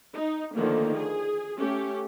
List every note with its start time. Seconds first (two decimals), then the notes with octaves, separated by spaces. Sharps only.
0.13 D#4
0.54 D3 D#3 F3 A3 A#3
0.96 G#4
1.57 A3 C#4 G4